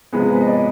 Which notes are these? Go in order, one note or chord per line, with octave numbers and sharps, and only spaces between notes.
C3 F3 G#3 B3 G#4
B4
D#5
D5